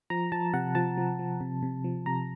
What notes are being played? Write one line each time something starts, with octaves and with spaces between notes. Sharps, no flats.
F3 A#5
F3 A5
C3 F#5
F3 A5
F3
F3
C3
C3
F3
C3 A#5